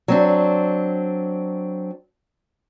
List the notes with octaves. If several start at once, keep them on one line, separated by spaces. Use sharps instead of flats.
F#3 C4 D4